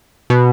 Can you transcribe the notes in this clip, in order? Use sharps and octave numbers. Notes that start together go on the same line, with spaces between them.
B2